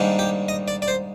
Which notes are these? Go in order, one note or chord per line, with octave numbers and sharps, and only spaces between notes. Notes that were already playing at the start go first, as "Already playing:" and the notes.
Already playing: G#2 D#3 G3 A#3 D4
G4
D#5
D5
D5
C5